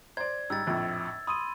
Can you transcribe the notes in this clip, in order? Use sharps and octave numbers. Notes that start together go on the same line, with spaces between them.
C5 D5 G#6
G#2 G3 E6 A6
A#1 F2 A2
B5 C6 D#6 D#7